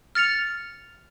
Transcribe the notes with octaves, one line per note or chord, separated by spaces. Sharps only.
F6 A6 C#7 F7